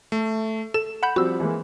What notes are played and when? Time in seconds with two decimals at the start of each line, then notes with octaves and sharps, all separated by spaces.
0.12 A3
0.74 A4 E7
1.03 F#5 B5 G6
1.16 F3 G3 C4 F#4 E6
1.40 E3 G#3 A#3